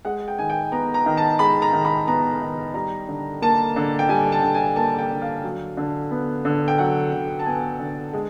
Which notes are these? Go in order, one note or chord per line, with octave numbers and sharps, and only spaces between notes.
G#3 F#5
G5
D#3 G#5
G5
B3 A#5
A#5
D#3
A5
G#3 B5
A#5
D#3
B5
B3 A#5
D#3
G3 A#5
D3
A#3 A5
D3
G5
G3 G#5
A5
D3
G#5
A#3 A5
G5
D3
F5
F#3
D3
B3
D3
G5
F#3 F#5
D3
A5
B3 G#5
D3
G#3